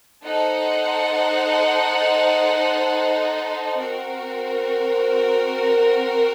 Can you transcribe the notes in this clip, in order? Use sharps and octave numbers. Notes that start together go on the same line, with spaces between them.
D#4 A4 C5 F#5
C4 F#4 A#4